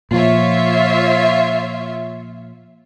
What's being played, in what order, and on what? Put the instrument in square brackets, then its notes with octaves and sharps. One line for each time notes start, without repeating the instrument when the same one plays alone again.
[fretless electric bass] A#2 F3 [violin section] F4 C#5 E5